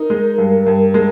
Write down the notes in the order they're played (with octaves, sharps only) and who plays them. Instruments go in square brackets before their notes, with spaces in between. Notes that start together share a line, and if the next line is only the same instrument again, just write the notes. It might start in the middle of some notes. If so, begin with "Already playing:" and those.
Already playing: [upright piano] D#4 [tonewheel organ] A#4
[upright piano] G#3
G2
G2
G#3